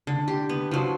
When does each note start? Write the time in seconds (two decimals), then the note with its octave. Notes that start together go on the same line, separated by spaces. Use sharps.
0.07 D3
0.28 G4
0.49 B3
0.71 F3 F#3